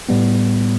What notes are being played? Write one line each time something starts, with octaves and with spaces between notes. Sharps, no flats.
A2 G3 B3